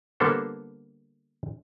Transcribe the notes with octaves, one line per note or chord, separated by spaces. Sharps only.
D3 G3 A#3 B3 A4 C5